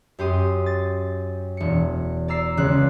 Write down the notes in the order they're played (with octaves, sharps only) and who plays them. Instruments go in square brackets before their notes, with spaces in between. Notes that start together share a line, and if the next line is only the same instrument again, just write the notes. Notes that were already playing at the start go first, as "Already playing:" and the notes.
[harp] F#2 G4 C6 D#6
A6
E1 C#7
D5 A#5 E6 C7
C#2 C#3 F3 F#6